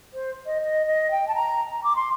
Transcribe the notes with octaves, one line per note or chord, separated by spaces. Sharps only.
C5
D#5
D#5
D#5
G5
A5
A#5
A#5
D6
C6